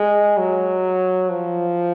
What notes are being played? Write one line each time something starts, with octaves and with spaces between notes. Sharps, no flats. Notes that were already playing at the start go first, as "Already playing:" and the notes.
Already playing: G#3
F#3
F3